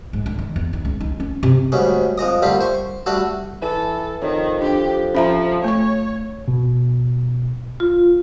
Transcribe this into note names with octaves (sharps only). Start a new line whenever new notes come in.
G#2
D3
D#3
E2
D#3
C#2
D#4
C#4
C3
D2 G#2 G3 C#4
F2 G#3 D#5 D#6
A#2 D3 G3 A3 F4 G4
C5 C#6
G3 A3 D4 F#4 A4
E3 A4
F2 D#3 C#5
D4 G4
F3 C#4 E5 A#5
A3 C#5 C#6
B2
F4